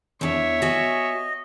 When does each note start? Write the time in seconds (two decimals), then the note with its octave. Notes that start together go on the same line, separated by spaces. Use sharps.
0.21 E2 D4 C#5 E5
0.62 F#4 D#5 G#5